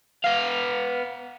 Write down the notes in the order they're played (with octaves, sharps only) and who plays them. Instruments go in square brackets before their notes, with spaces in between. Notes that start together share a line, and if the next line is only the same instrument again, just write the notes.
[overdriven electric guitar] B3 F5